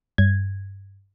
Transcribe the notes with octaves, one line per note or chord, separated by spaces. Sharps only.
G2 G#6